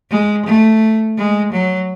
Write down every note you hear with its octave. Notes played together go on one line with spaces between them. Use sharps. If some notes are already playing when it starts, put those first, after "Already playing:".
G#3
A3
G#3
F#3